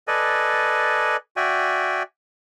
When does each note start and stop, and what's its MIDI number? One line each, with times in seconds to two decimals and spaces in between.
0.08 1.16 69
0.08 1.16 71
0.08 1.16 74
0.08 1.16 75
0.08 1.16 80
1.37 2.03 66
1.37 2.03 74
1.37 2.03 76
1.37 2.03 79
1.37 2.03 80